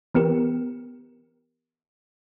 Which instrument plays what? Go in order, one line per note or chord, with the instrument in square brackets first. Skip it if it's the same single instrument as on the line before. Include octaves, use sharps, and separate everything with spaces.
[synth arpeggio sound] E3 B3 G4 A#4